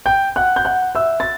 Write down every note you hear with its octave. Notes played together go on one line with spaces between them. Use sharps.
G5 G6
F#5 F#6
G6
F#5 F#6
E5 E6
A6